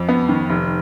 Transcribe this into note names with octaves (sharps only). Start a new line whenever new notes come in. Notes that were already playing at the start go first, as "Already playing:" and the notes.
Already playing: F2
B3
D#3
F1